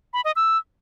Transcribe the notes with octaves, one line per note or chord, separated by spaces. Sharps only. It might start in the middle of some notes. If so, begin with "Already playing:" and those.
B5
D#5
E6